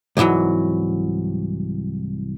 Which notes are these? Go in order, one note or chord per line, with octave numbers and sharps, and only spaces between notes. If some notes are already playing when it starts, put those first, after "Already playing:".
C2 G#2 B2 E3 F#3